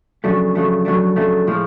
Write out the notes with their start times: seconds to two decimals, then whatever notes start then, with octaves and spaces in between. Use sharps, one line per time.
0.24 F2 C#3 F#3 A3 D4
0.55 F2 C#3 F#3 A3 D4
0.85 F2 C#3 F#3 A3 D4
1.16 F2 C#3 F#3 A3 D4
1.47 A2 F3 G#3